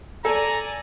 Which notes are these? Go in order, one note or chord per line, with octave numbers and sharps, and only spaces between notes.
A4 D5 G#5 A#5